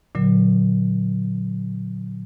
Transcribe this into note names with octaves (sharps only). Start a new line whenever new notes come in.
A#2 D3 F#3